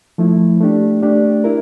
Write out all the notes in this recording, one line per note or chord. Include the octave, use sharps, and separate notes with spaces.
F3 A3 E4
A3 D4 G4
A3 D4 G4
E4 A#4